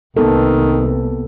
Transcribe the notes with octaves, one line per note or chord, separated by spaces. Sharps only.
C2 D#3 A#3 B3 A4